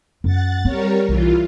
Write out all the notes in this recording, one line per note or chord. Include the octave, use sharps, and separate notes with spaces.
F#2 F#5 A6
G3 C4 A#4 C#5
B1 E3 F4